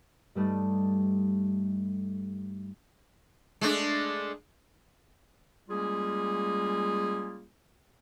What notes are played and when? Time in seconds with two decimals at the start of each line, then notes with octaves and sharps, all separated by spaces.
0.35 G2 G3 A3 D#4
3.61 G#3 A3 D4
5.69 G3 G#3 A#3 C#4 F4 G#4